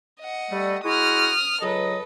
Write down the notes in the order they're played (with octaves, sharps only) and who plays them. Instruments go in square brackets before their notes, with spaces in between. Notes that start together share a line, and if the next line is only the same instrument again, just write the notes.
[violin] D#5 F#5
[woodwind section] G3 A3
[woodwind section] G#3 E4 F#4 [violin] D#6 F6
[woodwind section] C#2 F#3 D#5 [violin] A4 B4